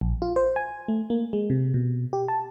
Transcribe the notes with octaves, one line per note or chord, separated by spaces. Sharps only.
A#1
F4
C5
G#5
A3
A#3
G#3
C3
B2
G4
A5